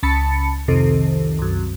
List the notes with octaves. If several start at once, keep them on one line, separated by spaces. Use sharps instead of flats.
C#2 A5 B5 A6 C#7
C2 F2 C3 D#3 A4
C2 F#2